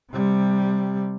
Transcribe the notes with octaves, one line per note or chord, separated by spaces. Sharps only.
C3 G3